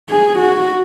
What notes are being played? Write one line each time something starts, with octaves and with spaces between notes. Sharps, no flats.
G#4
F#4